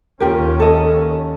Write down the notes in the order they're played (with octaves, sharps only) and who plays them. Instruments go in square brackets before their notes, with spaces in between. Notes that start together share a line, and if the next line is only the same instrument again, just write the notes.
[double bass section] D#2 C#4 [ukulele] F4 G4 A#4
[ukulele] A4 D#5